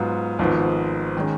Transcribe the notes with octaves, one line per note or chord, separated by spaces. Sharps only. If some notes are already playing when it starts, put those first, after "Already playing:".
Already playing: G#2 F#3 B3 F4
G#1 G#2 F3 B3
D#3 G#3 C#4